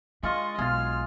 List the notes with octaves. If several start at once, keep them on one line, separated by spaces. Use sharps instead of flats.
G#3 D4 F4 D#5 C#6
B1 F4 G#4 F6